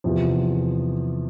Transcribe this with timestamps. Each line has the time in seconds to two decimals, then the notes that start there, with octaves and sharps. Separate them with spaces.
0.04 E2 C3 F3